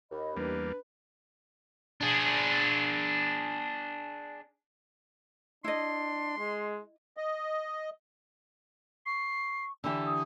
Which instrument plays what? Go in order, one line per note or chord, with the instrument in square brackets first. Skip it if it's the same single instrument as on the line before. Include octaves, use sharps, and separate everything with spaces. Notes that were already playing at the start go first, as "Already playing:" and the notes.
[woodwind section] D#2 [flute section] D#5 B5
[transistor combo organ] E2 G3 A#3 [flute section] D4 [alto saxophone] B4
[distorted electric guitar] D4 G#4
[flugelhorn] D4 [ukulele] E4 D#5 [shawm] C6
[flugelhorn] G#3
[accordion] D#5
[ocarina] C#6 [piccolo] C7
[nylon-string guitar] D3 E3 G4 [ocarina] B5 [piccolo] E6
[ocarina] D#6